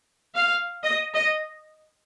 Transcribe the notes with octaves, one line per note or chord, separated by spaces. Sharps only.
F5
D#5
D#5